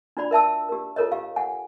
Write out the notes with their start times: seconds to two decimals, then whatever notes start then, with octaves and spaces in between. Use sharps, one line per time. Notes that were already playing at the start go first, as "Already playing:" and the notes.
0.17 D4 F4 F#4 D5 B5
0.31 A#4 E5 A5 E6
0.69 G4 A#4
0.96 F4 A4 A#4 C#5 D#5
1.12 G4 F5
1.36 F#5 G#5